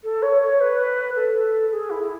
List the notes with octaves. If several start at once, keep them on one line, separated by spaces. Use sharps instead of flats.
A4
C#5
C#5
B4
A4
G#4
E4
E4